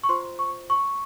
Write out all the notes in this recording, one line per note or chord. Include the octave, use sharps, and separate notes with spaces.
C#6
F4 C5 C6
C#6
C#6